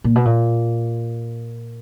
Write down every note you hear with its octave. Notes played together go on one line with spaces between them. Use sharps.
A#2
B2
A#2